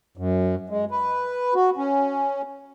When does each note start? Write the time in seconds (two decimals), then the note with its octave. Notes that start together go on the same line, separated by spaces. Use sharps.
0.17 F#2
0.69 G#3
0.91 B4
1.55 F#4
1.77 C#4